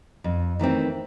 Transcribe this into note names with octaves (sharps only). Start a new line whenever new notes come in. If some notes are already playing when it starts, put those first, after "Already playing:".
F2
D#3 E3 A3 C4